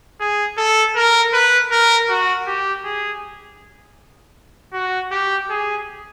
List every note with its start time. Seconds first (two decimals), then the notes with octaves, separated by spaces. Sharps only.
0.20 G#4
0.57 A4
0.96 A#4
1.33 B4
1.71 A#4
2.09 F#4
2.47 G4
2.85 G#4
4.73 F#4
5.11 G4
5.50 G#4